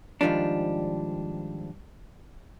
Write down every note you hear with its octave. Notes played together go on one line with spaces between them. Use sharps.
G#2 D#3 F3 G3 D4